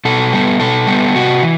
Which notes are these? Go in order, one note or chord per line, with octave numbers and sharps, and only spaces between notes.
B2 A4
G3 B3
B2 A4
G3 B3
C3 F#4
E3